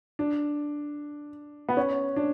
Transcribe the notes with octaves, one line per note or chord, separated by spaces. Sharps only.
D4
B3
C#4
D4